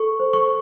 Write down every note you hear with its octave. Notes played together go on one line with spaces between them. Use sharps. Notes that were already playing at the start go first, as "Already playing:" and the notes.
Already playing: A4 C#6
C5
C#6